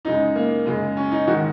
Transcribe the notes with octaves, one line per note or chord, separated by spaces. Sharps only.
F#2 C#3 G#3 D#4
A#3
F#2 C#3 G#3
C#4
D#4
G#2 D#3 G#3 F#4